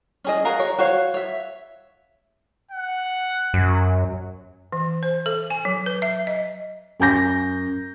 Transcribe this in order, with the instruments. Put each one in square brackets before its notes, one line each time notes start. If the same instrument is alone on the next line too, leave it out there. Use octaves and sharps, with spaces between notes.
[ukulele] C#4 G#4 D#5
F#4 G#4 A#4 F5
C#5
F#4 C5 C#5 F5
C#5 E5
[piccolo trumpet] F#5
[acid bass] F#2
[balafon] E3
C5
A4
G#5
F#3
B4
E5
D#5
[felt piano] F#2 G#5 G6 A#6